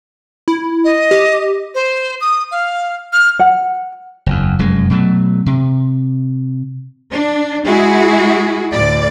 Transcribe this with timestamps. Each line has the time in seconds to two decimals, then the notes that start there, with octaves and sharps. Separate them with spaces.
0.48 E4
0.84 D#5
1.11 G4
1.75 C5
2.21 D#6
2.51 F5
3.13 F6
3.39 F#5
4.26 F#1 E2
4.59 F1 F#2 G#3
4.90 B2 F#3 A3
5.46 C3
7.11 D4
7.64 G#3 E4 F#4 G#4
8.72 D2 A2 D5